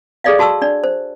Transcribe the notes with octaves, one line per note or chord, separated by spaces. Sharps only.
G#4 A4 D5 D#5 F5
F#4 A5 C#6 E6
D4 D5
C5